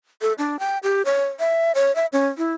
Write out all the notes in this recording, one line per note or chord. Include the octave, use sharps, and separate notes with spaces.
A4
D4
G5
G4
C#5
E5
C#5
E5
C#4
E4